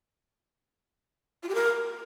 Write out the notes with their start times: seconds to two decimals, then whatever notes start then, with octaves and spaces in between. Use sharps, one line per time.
1.42 F4
1.48 G4
1.54 A#4